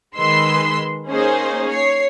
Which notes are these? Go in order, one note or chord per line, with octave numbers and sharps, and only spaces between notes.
D#3 G#3 B4 C6 E6 C7
A#3 C#4 D#4 G#4 C5
C#5 C7